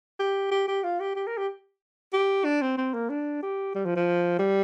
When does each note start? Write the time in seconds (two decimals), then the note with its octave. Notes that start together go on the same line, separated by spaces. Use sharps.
0.19 G4
0.51 G4
0.68 G4
0.83 F4
1.00 G4
1.16 G4
1.27 A#4
1.38 G4
2.13 G4
2.45 D4
2.62 C4
2.78 C4
2.94 A#3
3.10 D4
3.42 G4
3.75 G3
3.85 F3
3.96 F3
4.39 G3